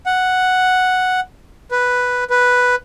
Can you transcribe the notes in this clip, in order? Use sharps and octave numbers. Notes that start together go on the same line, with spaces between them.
F#5
B4
B4